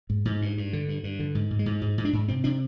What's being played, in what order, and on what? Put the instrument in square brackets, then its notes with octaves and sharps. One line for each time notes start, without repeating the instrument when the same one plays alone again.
[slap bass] G#2
G#2
G2
G2
D3
G2
G2
D3
G#2
G#2
G#3
G#2
G#2
G#2
D4
G#2
C3 C4
C3 D4